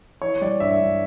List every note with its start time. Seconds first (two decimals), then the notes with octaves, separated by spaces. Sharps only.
0.22 E3 C#5
0.41 G3 D5
0.60 G2 E5
0.80 G2